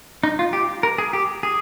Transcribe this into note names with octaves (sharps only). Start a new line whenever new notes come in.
D#4
F4
G4
A#4
G#4
G4
G#4